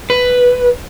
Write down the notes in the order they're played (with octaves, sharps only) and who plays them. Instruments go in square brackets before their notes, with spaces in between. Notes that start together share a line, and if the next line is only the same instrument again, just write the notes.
[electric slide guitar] B4